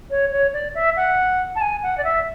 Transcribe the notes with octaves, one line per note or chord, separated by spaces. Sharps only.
C#5
C#5
D5
E5
F#5
A5
G#5
F#5
D5
E5